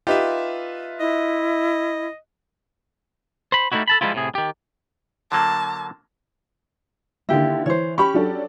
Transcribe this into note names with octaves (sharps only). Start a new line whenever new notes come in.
D#4 F4 G4 B4 E5
E4 D#5
C5 B5
G3 A3 C4 D#4 E4 F#4
A4 A5 B5
F3 G3 G#3 C4 E4 F4
A2 C3 G#4
D#3 G4
D3 F#3 A#3 A5
D3 D#3 A#3 E4 G4
E3 C5 C#5
C#4 G4 B5 C#6
F#3 D4 A4